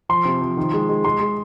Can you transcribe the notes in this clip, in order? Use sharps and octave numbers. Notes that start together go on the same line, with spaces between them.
F3 C6
C3
F3
D#3
G#3
G#3
G#3 C6
G#3